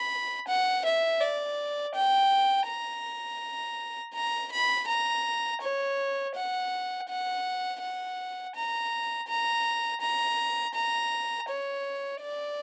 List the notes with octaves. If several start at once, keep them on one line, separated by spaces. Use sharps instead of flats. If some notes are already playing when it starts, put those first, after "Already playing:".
Already playing: B5
F#5
E5
D5
G5
A#5
A#5
B5
A#5
C#5
F#5
F#5
F#5
A#5
A#5
A#5
A#5
C#5
D5